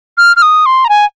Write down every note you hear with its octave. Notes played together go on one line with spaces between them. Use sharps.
F6
F6
D#6
C6
A#5
G#5